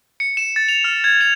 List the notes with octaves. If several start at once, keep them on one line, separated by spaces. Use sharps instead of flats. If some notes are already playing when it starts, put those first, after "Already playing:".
C#7
E7
A6
F7
F6
G#6
F7